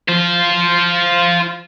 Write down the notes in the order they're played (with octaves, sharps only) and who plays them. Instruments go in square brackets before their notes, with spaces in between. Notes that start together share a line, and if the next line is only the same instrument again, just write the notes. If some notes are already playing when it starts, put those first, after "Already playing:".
[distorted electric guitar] F4 C5